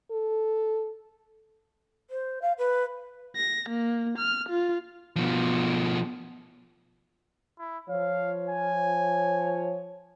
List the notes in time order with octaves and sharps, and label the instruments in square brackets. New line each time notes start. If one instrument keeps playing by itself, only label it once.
[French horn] A4
[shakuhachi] C5
F5
B4
[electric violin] A#6
A#3
F6
F4
[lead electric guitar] B2 F3
[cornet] E4
[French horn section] F3 C#5 [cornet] F5
[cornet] G#5